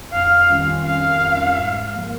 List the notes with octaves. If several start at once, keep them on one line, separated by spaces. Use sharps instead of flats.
F2 F5
D#3 G3 C#4 F4
F2 F5
D#3 G3 C#4 F4
G#2
F3 A#3